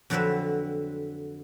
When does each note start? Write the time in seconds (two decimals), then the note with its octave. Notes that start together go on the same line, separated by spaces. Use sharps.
0.10 F2 D3 F#3 C4 B4 E5